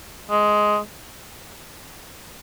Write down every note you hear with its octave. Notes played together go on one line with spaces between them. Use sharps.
G#3